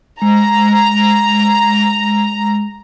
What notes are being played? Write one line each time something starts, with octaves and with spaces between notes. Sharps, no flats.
G#3 A#5